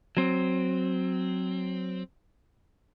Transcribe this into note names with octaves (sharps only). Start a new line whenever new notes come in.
F#3 C4